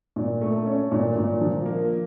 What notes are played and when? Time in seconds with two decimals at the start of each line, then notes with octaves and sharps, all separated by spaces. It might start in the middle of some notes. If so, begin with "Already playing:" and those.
0.16 A#2
0.41 A3
0.66 C#4
0.92 A#2
1.16 A#2
1.41 F3
1.66 A#3